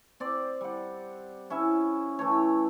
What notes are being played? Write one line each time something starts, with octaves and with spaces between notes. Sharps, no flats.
C4 D5
G3 F#5
C#4 E4 E5
E3 A3 C#5